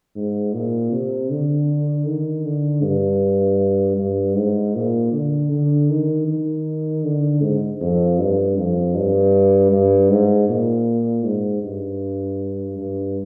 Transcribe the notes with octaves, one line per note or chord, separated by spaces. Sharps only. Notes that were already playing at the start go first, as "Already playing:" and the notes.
G#2
A#2
C3
D3
D#3
D3
G2
G2
G#2
A#2
D3
D3
D#3
D#3
D3
G#2
F2
G2
F2
G2
G2
G#2
A#2
G#2
G2
G2